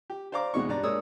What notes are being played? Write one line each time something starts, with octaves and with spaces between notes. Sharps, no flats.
G4
C5 D5 F5 A#5 D6
E2 B2 G#3 D#4 C#6
G2 D5 A#5
G#3 A#3 D4 C#5 D#6 E6